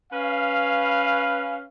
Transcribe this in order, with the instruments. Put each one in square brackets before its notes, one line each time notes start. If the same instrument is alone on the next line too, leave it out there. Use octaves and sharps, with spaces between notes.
[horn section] C#4 B4 F5